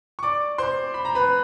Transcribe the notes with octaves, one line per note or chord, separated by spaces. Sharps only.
C#6
D5 D6
C5 C6
B5
A#5
B4 B5